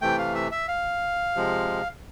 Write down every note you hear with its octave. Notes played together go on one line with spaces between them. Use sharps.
C3 E3 A3 G5
F5
E5
E5
F5
C3 F3 G#3